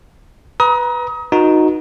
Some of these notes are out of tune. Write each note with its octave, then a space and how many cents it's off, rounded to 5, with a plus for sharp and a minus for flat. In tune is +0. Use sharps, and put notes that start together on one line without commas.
B4 +0 A#5 +30 D#6 +30
D#4 +0 F#4 -20 B4 -40